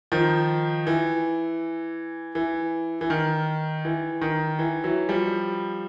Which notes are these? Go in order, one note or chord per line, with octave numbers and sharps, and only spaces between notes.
D#3 F3
E3
E3
E3
D#3
E3
D#3
E3
E3 F#3
F3 G3